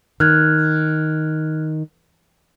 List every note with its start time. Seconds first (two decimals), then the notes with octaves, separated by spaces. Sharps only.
0.20 D#3 F6 F#6 G#6